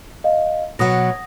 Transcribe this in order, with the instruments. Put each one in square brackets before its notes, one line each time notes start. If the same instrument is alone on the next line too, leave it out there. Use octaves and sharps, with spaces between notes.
[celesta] D#5 F5
[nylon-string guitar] B2 F#3 [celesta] F#5 D#6 A#6